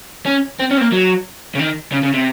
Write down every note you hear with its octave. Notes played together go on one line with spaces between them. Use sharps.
C#4
C4
C#4
C4
A#3
F#3
C#3
D#3
C#3
C#3
C3